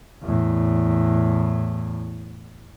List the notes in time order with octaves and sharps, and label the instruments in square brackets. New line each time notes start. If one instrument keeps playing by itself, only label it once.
[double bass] E2 A2